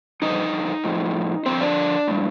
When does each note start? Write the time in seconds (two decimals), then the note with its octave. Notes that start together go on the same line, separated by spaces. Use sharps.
0.22 F2 D3 G3 D#4 D#5
0.84 A2 F3
1.46 G2 D3 F3 C4 C5
1.61 D4 D5
2.08 A2 G3